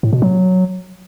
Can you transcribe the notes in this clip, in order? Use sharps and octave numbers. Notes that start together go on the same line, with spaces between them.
A2
B2
F#3